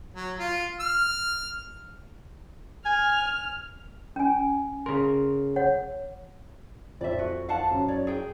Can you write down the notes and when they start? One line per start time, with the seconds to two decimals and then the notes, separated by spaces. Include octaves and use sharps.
0.14 F#3
0.39 F4
0.80 F6
2.86 G#5 F6
4.16 C#4 G#5
4.86 C#3 A#4 C6
5.56 C#5 F#5
7.01 F2 D5 E5
7.19 F#4
7.49 F5 F#5 A5
7.71 F#2
7.88 C#5 D5
8.07 G#4 G5